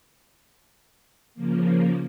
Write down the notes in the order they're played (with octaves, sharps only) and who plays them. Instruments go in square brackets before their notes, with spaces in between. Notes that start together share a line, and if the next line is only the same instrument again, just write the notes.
[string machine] C#3 F3 A#3